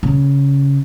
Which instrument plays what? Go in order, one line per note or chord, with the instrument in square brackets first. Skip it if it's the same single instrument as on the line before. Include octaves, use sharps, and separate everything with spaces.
[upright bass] C#3